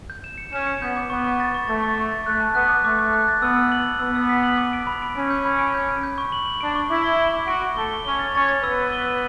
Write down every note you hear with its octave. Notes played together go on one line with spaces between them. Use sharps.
G6
E7
C#7
C#4 E7
C#7
B3 G6
D6
B3 C#6
C#6
A6
C#6
A3 A6
C#6
C#6
A6
A3 F#6
A5
B3 F#6
D6
A3 D6
D6
F#6
A6
B3 E6
E6
F#7
E6
B3 E6
E6
B6
F#7
D6
D7
B5
D7
C#4 D7
G6
B5
D7
G6
D7
G6
C#6
F#7
F#7
D4 D7
C#6
E4 D6
G7
G7
D6
F#4 D7
D7
A3 A4 G7
G7
C#4 C#5 G7
A6
C#4 C#5 A6
A6
B3 B4 E6
A6
G7
E6